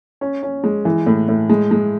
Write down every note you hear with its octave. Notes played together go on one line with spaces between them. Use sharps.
C#4
C#4
G#3
E3
A2
A2
G#3
G#3